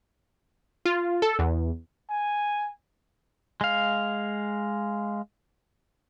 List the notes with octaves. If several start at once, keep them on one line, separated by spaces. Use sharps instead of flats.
F4
A4
E2
G#5
G#3 F5